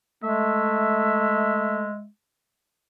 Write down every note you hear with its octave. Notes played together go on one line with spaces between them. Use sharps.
G#3 A3 E5